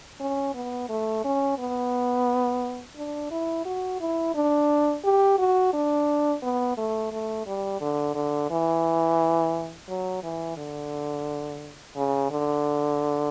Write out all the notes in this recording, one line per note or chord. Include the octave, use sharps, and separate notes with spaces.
C#4
B3
A3
C#4
B3
D4
E4
F#4
E4
D4
G4
F#4
D4
B3
A3
A3
G3
D3
D3
E3
F#3
E3
D3
C#3
D3